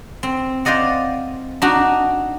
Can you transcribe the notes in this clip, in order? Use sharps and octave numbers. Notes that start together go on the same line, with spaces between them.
C4
F4 C5 D5 D#5 F#5
D4 D#4 F#4